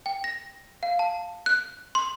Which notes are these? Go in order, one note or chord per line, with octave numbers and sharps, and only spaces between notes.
G5
A#6
F5
A5
F#6
C6